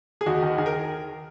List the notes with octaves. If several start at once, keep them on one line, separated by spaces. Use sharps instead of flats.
G#4
D#2 D#4 F#4
D#3
D#3 G#4
A#4